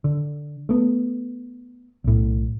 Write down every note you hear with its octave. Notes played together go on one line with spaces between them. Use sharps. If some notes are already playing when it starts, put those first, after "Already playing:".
D3
A3 B3
B1 A2